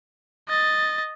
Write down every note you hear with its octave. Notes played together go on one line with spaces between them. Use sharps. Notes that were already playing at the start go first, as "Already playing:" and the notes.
D#5 A6